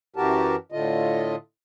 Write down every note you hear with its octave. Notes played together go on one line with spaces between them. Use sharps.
F#2 E3 F#4 G4 A#4 A5
A2 D3 A3 F4 D#5